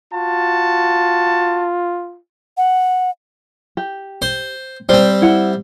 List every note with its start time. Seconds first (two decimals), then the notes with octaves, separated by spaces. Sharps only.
0.13 F4 F#4 A5
2.57 F#5
3.77 G4
4.22 C5
4.89 G3 C4 C5
5.22 E4 F#5